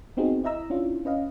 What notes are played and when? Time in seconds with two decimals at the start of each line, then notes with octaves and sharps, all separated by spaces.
0.17 B3 C4 D#4 F#4 G#4
0.44 E4 D#5 E5 A#5 E6
0.70 C#4 D4 E4 F4
1.05 C#4 B4 D#5 F5